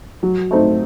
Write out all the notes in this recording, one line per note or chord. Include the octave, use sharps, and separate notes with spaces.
F#3
A3 C4 D#4